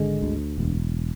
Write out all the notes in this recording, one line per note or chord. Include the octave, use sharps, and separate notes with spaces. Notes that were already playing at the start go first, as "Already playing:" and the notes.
Already playing: G#1 D3 G#3
D2
E1